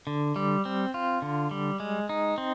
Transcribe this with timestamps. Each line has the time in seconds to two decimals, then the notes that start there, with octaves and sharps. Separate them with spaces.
0.07 D3
0.36 G3
0.65 C4
0.94 F4
1.22 D3
1.51 G3
1.80 G#3
2.09 D#4
2.38 C4